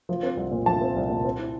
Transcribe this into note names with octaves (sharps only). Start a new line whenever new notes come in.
F3
C4
C2
A#2
F3 A5
C4
C2
A#2
C4
E4